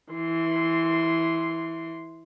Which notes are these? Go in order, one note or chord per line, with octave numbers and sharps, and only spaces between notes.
E3 C6